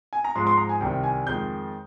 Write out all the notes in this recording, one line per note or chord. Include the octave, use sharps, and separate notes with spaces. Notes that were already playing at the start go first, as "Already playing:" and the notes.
G#5
A#5
G#2 F3 G#3 C6
C6
A#5
G#5
C2 C3 D#3 G3 G5
G#5
F2 D#3 G#3 G6